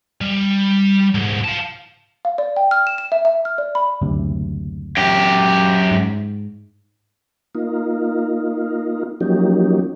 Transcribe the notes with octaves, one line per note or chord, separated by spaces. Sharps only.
G3
C2 G#2
F5 A5
F5
D5
G5
F6
E7
E7
E5
E5
F6
D5
B5
F#1 D2 C3
F#2 G4
G#2
A#3 D#4 F4
F3 F#3 A#3 C#4 D#4 G4